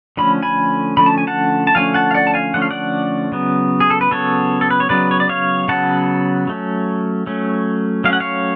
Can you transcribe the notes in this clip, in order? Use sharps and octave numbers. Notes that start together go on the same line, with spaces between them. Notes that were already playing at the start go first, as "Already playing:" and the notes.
D3 F3 A3 C#4 B5
G#5 B5
D3 F3 A3 C#4 B5
A5
G#5
F#5 A5
A5
D3 F3 A3 C#4 F5 G#5
F#5 A5
F5
D5 F#5
A5
F5 G#5
D3 F3 A3 C#4 F#5
F5
D5 F#5
C#3 F#3 B3
G#4
A4
B4
C#3 F#3 B3 A4 C#5
A4
B4
C#5
C#3 F#3 B3 B4 D5
C#5
D5
C#5 F5
C#3 F#3 B3 F#5 A5
F#3 A3 C#4
F#3 A3 C#4
F#3 A3 C#4 F5
F#5
C#5 F5